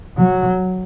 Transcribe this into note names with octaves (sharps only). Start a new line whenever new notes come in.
F#3